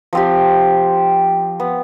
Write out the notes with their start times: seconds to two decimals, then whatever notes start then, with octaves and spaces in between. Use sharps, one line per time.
0.13 F3 C4 G4
1.60 B3